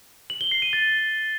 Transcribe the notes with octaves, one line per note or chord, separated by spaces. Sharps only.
F#7
G7
C7
D#7
A6